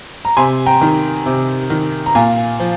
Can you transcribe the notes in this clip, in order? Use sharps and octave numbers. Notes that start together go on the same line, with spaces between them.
A#5
C3 G#5 C6
G5 A#5
D#3
C3
D#3
A#5
A#2 F5 G#5
F3